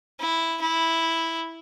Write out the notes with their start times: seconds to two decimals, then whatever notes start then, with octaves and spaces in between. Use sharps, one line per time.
0.20 E4
0.61 E4